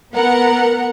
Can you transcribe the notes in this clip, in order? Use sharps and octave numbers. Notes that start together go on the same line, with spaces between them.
B3 A#4 F#5